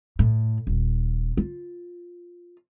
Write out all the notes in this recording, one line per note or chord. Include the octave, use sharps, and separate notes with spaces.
A2
D#1
F4